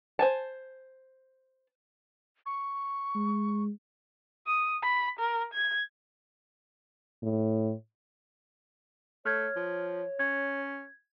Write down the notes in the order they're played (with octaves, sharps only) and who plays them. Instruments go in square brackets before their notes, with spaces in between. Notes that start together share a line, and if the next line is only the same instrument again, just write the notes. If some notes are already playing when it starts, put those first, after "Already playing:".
[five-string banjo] C5 G#5 A5
[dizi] C#6
[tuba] G#3
[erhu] D#6
B5
A#4
G#6
[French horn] A2
[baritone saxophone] A3 [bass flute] C#5 [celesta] F6 G#6
[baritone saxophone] F3
[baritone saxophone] C#4 [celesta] G#6